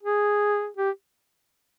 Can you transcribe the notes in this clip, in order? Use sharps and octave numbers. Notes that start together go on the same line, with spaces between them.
G#4
G4